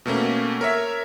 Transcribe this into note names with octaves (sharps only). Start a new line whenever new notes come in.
B2 A3 A#3 C#4
A#4 C#5 E5